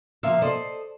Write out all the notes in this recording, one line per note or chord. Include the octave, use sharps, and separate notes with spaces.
C3 F3 A#3 C5 E5 F5
A4 C5 D5 D#5